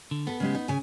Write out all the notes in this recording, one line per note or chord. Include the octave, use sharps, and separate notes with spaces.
D3
B3 A4 B4
C#3 G#3 G4
D#4
C#3 G#5